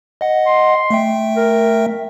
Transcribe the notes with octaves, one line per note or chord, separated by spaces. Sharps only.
D#5 F#5
C6
A3 E5 G5
A#4